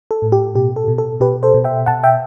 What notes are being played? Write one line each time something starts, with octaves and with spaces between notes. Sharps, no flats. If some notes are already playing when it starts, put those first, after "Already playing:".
A4
A2
G4
B2 G4
A4
B2
A4
B2 G4 B4
A4 C5
B2
E5 G5
B2 F#5 A5
E5 G5